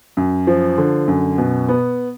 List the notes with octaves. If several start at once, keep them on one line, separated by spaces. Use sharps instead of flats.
F#2
F3
D3
F#2
B2
B3